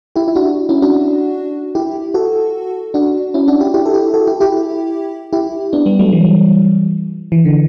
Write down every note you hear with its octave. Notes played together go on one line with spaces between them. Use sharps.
E4 G4
E4
D4 F#4
C#4 E4
D4 F#4
E4 G4
F#4 A4
D4 F#4
C#4 E4
D4 F#4
E4 G4
E4 G4
A4
E4 G4
F#4 A4
E4 G4
E4 G4
E4 G4
B3 D4
G3 B3
F#3 A3
E3 G3
E3
D3